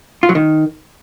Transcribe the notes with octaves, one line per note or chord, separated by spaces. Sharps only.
F4
F#3
D#3